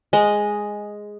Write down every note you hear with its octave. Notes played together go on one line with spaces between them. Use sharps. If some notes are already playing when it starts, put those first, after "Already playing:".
G#3 D#5